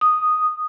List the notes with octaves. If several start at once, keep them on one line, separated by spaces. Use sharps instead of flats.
D#6